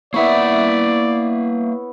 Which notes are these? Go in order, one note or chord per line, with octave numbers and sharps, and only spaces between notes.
A#3 B3 E4 C#5 D5 E5